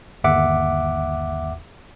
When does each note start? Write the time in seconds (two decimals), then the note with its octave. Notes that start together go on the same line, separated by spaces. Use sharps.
0.24 G1 D#2 E5 F#5 D6